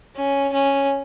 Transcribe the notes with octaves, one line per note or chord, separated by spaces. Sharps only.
C#4
C#4